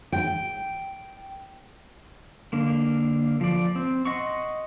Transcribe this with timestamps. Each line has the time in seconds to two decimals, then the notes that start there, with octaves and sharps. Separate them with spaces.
0.12 G5
2.53 D3 A#3
3.41 F3 D5
3.76 C4
4.05 D#5 F#5 C6 C#6